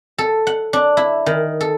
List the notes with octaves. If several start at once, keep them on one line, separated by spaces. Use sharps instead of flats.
A4
F#5
D4
E4
D#3
A4